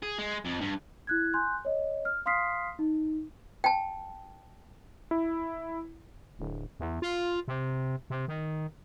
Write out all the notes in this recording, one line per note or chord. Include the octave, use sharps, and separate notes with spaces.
G#4
G#3
F2
G2
E4 F#6 G#6
G#5 C6 F#6 G6
C#5 D#5
F6
F5 C6 D#6 F6 B6 C7
D#4
G5 A5
E4
D1
E2
F4
C3
C3
D#3